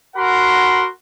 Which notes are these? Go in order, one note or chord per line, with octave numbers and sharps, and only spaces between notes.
F#4 A#4 F#5 B5 C6